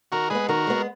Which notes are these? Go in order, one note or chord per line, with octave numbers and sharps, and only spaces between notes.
D#3 F#4 A#4
G#3 B3 G#4 B4
D#3 F#4 A#4
G#3 B3